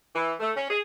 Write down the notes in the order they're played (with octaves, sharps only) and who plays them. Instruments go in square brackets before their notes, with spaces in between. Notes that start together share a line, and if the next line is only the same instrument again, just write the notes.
[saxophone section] E3
A3
C#4
G#4